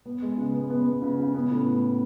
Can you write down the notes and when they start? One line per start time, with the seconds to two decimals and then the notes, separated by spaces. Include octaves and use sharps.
0.06 B3
0.22 G#3
0.38 C#3
0.54 B3
0.70 B3
0.86 B3
1.02 C#3
1.19 C#3
1.34 B3
1.50 A2